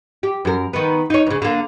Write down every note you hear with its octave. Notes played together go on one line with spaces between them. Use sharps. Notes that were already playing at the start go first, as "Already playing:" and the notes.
G4
F#2 A#4
D#3 B3
D#4 C#5
D2 C#3
D3 A#3